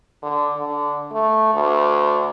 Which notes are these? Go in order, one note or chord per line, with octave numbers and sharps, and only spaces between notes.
D3
D3
A3
D2